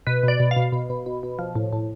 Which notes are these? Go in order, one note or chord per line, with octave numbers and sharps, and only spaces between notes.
B2 B4
B2 D5
B2
F5
B2
B2
B2
B2
B2
F3
A2
A2